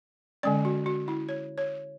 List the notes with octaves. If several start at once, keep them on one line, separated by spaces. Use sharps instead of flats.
D3 G#3 C#4 D5
F#4
F#4
E4
C#5
C#5